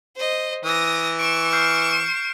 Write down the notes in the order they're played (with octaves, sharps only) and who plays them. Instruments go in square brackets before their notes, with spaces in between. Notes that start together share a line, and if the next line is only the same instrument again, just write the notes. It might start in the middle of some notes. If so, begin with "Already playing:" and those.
[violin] C5 D#5
[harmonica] E3 [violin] D#6 A#6
[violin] C#6 E7 [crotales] D7
[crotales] F6 G6 C7